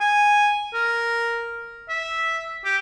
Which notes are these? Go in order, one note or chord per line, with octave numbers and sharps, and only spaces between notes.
G#5
A#4
E5
G4